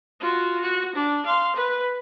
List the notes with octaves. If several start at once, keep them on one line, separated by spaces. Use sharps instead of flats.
F4 F#4
F#4
D4
F5 C6
B4